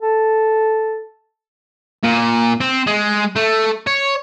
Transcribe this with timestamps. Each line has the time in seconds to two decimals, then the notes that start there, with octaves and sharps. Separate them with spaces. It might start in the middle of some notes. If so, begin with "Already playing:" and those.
0.01 A4
2.04 A#2
2.61 C4
2.87 G#3
3.36 A3
3.87 C#5